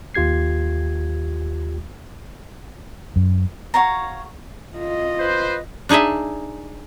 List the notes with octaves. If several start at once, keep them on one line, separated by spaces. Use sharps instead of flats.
D#2 F4 G4 G#6 C7
F#2
F#4 C#5 F5 A#5
F4 D#5
B4 C5
D4 D#4 G#4 D#5 E5